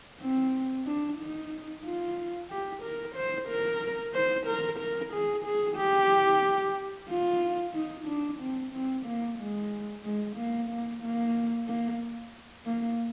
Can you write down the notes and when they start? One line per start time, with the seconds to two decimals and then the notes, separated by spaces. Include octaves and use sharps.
0.21 C4
0.86 D4
1.19 D#4
1.85 F4
2.50 G4
2.82 A#4
3.15 C5
3.48 A#4
4.14 C5
4.46 A#4
4.79 A#4
5.13 G#4
5.45 G#4
5.77 G4
7.09 F4
7.74 D#4
8.07 D4
8.39 C4
8.72 C4
9.06 A#3
9.38 G#3
10.04 G#3
10.36 A#3
10.70 A#3
11.02 A#3
11.68 A#3
12.65 A#3